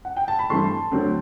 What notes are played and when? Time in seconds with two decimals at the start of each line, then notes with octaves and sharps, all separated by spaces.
0.05 F#5
0.17 G5
0.28 A5
0.39 B5
0.50 G2 E3 A3 C4 A5 C6
0.92 D2 D3 F#3 C4